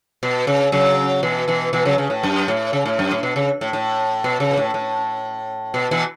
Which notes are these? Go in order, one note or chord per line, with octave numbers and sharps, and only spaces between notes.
B2
C#3
C#3 F#3
B2 E3
B2 E3
B2 E3
C#3 F#3
C#3
A2
F#2
A2
C#3
A2
F#2
A2
B2
C#3
A2
A2
B2
C#3
B2
A2
A2
B2
B2 E3